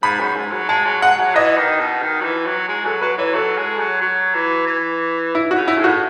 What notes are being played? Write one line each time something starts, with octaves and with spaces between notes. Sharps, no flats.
G#2 B5
F#2
G#2
F#3
G#3 A5
F#3
G#3 F#5
F#3
E3 D#5
D#3
B2
D#3
F#3
E3
F#3
G#3
F#3 A4
F#3 B4
E3 C#5
F#3 A4
G#3
F#3
F#3
E3
E3
E4
F#4
C#3
E4
A2
F#4